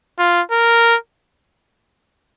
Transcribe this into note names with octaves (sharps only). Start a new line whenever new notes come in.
F4
A#4